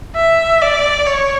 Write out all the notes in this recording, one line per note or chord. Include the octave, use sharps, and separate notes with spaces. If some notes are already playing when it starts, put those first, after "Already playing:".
E5
D5
C#5